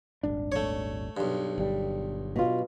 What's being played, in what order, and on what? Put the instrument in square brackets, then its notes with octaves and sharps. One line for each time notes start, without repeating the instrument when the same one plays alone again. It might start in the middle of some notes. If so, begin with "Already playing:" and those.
[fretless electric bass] D#1 G#1 D4
[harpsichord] A3 C#5
B1 G2
[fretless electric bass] G1 G3
[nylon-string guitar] B2 F4